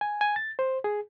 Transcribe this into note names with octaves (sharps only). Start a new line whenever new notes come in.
G#5
G#5
A6
C5
G#4